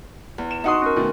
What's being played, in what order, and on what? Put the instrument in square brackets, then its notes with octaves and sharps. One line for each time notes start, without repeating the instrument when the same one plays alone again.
[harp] E2
[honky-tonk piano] E7
[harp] D#4 F#4 C6 [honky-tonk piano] D#5 F#5 D#6
[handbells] C#4 A#4
[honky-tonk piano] B2 D#3 A3